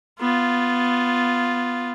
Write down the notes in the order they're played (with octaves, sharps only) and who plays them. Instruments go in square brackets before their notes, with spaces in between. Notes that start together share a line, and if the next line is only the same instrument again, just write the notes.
[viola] B3 F4